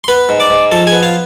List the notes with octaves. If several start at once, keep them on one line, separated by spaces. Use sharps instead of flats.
C6
B3 B4 B5
G#2
D5 D6
G#2
F3 A4 A5
G#4 G#5
B3
F4 F5